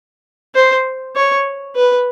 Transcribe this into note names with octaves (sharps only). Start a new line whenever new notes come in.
C5
C#5
B4